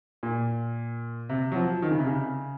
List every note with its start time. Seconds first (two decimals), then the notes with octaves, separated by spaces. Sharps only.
0.23 A#2
1.29 C3
1.52 F#3
1.56 F3
1.82 D#3
1.91 C#3
1.98 C3
2.07 C#3